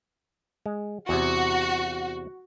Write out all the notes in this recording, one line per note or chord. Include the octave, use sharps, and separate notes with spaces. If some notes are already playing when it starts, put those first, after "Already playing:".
G#3
E2 C3 F#4